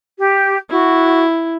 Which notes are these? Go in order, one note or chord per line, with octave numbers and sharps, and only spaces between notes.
G4
E4 F#4